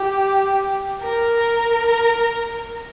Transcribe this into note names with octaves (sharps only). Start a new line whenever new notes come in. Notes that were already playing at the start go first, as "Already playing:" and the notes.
Already playing: G4
A#4